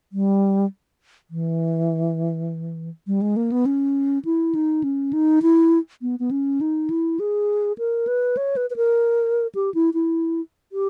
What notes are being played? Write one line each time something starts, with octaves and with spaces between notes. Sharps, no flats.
G3
E3
G3
G#3
A#3
B3
C#4
E4
D#4
C#4
D#4
E4
B3
B3
C#4
D#4
E4
G#4
A#4
B4
C#5
B4
B4
A#4
G4
E4
E4
G4